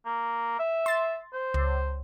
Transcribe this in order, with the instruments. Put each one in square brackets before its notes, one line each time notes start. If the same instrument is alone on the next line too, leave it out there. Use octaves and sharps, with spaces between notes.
[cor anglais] A#3
E5
[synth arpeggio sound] C6 A6
[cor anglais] C5
[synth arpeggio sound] C#2